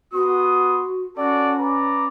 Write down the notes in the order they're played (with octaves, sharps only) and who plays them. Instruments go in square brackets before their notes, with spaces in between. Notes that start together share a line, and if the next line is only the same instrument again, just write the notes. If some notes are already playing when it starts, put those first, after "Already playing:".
[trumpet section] B3 C6 D#6 [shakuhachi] F#4
[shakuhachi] C#4 [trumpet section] F#4 A4 D5
[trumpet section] B4 D5 A#5